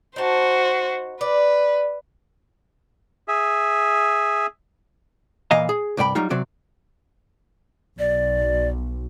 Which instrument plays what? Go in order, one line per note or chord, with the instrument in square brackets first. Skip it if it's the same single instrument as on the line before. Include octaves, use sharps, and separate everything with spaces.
[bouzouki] D#4 A5 [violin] F#4 C5
[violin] B4 [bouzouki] D5
[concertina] G#4 E5
[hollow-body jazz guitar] A#2 E3 D#5 F5 G#5 A#5
G#4
C2 G2 D5 G5 B5
F#3 G3 D#4 F4
C3 F#3 C4 D5
[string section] B1 [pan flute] D5